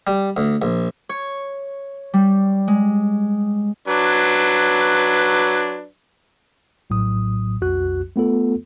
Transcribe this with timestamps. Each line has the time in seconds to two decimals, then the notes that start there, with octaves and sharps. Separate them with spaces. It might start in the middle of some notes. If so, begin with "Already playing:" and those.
0.07 G3
0.37 D2
0.62 A#1
1.09 C#5
2.14 G3
2.68 G#3
3.88 F#3 D4 B4
6.90 A#1 A2 F#3 D#6
7.61 B1 F2 F#4 F#6
8.16 A3 B3 F4 A4